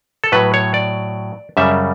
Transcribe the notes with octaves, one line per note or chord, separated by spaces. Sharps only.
A4
A2 F#3 B4
C#5
D5
F#2 C#3 G3 E5